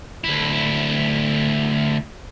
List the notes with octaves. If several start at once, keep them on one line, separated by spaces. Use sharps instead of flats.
D2 E4